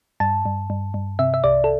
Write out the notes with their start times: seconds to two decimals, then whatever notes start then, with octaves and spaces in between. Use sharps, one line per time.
0.20 G2 A5
0.45 G2
0.70 G2
0.94 G2
1.19 C3 E5
1.34 E5
1.44 C2 D5
1.64 A4